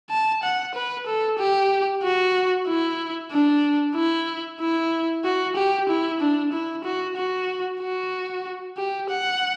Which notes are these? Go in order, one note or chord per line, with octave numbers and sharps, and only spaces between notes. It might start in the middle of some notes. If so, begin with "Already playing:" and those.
A5
F#5
B4
A4
G4
F#4
E4
D4
E4
E4
F#4
G4
E4
D4
E4
F#4
F#4
F#4
G4
F#5